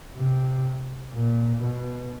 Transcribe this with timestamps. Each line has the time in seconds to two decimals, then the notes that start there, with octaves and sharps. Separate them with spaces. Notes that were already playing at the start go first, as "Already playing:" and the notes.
0.16 C3
1.13 A#2
1.63 B2